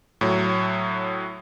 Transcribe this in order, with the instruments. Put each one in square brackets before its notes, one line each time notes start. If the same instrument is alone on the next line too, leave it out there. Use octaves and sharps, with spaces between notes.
[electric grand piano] A2 F#3